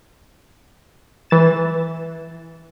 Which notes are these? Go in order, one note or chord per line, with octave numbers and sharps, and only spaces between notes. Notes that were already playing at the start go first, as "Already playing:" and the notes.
E3 A6 E7